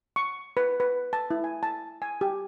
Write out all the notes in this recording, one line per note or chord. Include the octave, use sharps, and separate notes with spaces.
C#6
B4
B4
A5
E4
G#5
A5
G#5
G4